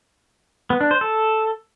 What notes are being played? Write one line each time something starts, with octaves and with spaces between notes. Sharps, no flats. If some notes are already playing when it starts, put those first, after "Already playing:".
B3
D4
C5
A4